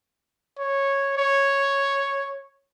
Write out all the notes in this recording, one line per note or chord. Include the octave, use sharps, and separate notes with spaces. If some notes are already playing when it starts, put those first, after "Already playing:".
C#5
C#5